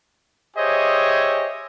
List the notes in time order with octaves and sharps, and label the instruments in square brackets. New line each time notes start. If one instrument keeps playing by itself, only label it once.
[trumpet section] G4 G#4 C5 C#5 D#5 E5